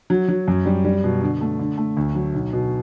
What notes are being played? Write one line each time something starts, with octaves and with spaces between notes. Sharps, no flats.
F#3
F#3
F#2
G3
G3
B2
D3
A3
D3
A3
D2
F#3
B1
B2